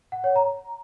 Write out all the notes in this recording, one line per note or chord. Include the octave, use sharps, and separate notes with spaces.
F#5
C#5
A#5